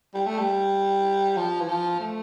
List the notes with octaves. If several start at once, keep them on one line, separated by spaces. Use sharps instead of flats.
G3
A3
G3
F3
E3
F3
A3